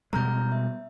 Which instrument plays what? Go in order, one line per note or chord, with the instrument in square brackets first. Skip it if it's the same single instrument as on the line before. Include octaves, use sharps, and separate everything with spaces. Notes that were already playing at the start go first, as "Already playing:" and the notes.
[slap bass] B2 G3 G#3 [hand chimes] A#5 F6 G6
[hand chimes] E5